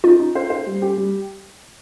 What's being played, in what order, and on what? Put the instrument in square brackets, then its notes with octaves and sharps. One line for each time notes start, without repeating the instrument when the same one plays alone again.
[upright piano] D#4 [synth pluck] F4
[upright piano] D#4
C5
C5
G3
G4
G3